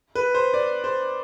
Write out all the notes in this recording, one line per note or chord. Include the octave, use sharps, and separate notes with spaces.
B4
C5
D5
C5